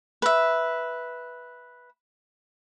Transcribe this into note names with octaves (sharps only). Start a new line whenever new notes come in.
B4 E5